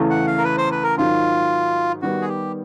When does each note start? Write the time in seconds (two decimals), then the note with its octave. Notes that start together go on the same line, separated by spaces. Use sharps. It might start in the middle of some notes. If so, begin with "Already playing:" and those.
Already playing: E2 C#3 E3 A3
0.10 F#5
0.27 F5
0.38 A#4
0.44 B4
0.58 C5
0.72 B4
0.84 A#4
0.97 G#2 D#3 F#3 F4
2.02 D#3 G3 B3 F#4
2.21 G#4
2.29 G4